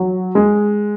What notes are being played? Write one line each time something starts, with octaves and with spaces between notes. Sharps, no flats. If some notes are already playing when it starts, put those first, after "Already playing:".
Already playing: F#3
G#3